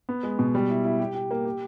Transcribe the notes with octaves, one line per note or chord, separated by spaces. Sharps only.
B3
G#3
B2
G3
E4
E4
G4
G4
A#3
G4